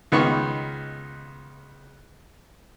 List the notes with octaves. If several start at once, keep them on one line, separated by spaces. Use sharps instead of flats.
C#2 D#3 B3 C#6